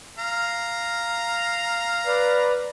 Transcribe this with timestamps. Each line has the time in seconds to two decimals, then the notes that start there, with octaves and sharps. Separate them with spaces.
0.18 F5 A#5
2.06 B4 D5